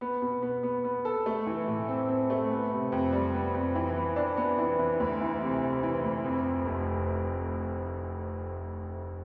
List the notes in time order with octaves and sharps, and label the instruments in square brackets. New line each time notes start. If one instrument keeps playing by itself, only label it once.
[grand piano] B3
B2
B3
B3
B3
A4
A3
E3
A2
C4
C4
A3
B3
C3
F2
G3
B3
F2
E3
B3
D4
B3
E3
E3
D2
E3
C3
C3
E3
D2
F2
F2
F1